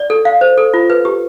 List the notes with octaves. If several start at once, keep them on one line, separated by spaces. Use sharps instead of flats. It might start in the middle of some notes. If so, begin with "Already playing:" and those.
Already playing: D5
A4
F5
C5
A4
F4
B4
G4